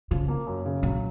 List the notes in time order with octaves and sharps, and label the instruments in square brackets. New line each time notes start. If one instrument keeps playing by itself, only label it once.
[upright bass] C#3 [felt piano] F3
[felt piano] A#3
F#2
C#3
[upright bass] A#2 [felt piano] F#3